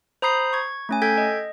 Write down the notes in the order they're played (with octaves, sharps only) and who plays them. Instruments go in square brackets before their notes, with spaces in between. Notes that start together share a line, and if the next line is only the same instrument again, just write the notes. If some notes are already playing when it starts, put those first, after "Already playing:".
[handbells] C5 A#5 B5 D#6 G6 C7
C#6 G#6
A3 C#4 G#5
A4 G5 G6 G#6 B6
D#5